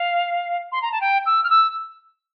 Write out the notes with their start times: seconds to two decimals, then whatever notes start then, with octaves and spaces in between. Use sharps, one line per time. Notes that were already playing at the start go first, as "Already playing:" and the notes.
Already playing: F5
0.72 C6
0.82 A#5
0.92 A5
1.01 G5
1.26 E6
1.44 F6
1.50 E6